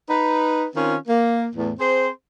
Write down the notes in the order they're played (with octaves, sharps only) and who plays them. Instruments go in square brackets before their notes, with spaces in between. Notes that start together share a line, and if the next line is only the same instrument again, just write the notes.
[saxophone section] D#4 B4
D#3 C4 C#4 F4
A#3
E2 A2
C4 G#4 C5